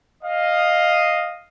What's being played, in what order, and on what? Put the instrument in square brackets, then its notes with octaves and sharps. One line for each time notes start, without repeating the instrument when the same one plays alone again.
[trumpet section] D#5 F5